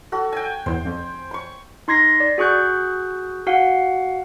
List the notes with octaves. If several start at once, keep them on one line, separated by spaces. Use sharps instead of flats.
F#4 A4
G5 G#5
E2 C5
F2
C6 C#6
D#4 C6 G#6 A#6 C7
D5
F#4 G#4 C#6 F#6 G6
F#4 F5 F#5